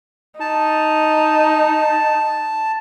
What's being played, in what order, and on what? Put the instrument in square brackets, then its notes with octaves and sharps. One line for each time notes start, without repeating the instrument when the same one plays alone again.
[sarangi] D#4 [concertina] A5